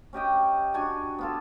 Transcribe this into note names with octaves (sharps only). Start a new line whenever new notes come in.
C#4 G4 D#5 G5
D4 F#4 G#4 G#5
B3 F4 A4